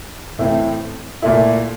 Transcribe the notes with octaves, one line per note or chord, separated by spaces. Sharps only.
A2 E3 A3 C4 E4
A#2 A3 E4